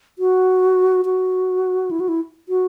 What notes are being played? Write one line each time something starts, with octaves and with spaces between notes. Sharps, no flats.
F#4
F#4
E4
F#4
E4
F#4